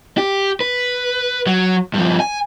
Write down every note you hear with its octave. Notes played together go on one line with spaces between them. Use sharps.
G4
B4
F#3
G2 F3
G#5